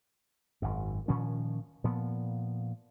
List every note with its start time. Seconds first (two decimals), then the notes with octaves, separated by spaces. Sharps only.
0.62 G#1 F#2
1.08 A#2 D#3 F3 C#4
1.84 A#2 F3 B3